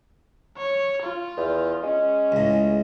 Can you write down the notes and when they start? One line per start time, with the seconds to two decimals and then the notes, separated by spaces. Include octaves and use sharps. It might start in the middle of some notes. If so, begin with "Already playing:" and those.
0.57 C#5
1.03 F4
1.37 E2
1.83 G#3 C#4
2.32 C#2 A2